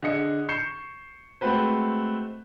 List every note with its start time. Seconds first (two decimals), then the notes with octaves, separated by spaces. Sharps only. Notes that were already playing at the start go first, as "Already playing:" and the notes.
0.02 D3 G#4 D#5 C#7
0.49 C#6 G6 C7 C#7 E7
1.41 G#3 A3 C4 F#4 B4 C5